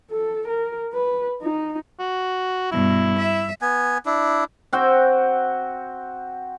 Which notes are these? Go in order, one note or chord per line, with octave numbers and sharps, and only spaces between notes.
A4
A#4
B4
D#4
F#4
G2 B2 E4
E5
B3 G#5
D4 E4
C4 F#4 F#5 G5